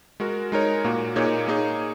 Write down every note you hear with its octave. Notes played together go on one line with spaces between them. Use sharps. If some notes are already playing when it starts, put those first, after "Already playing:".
G#3 F#4 A#4
G#3 D#4 A#4 C#5
A#2 A#3 F#4
A#2 A#3 D#4 G#4 C#5
A#3 D#4 G#4 C#5